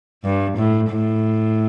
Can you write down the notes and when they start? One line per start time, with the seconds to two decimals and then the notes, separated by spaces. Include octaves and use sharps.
0.24 G2
0.57 A2
0.91 A2